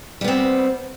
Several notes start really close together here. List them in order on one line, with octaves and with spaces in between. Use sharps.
G3 B3 C4